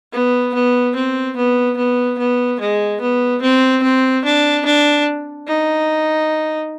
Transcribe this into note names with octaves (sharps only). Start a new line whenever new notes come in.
B3
B3
C4
B3
B3
B3
G#3
B3
C4
C4
D4
D4
D#4